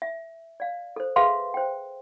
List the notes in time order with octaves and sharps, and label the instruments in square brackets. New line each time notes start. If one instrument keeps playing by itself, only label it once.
[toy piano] E5
D5 F5
A4 C5
G#4 B4 E5 F5 C6
C5 G5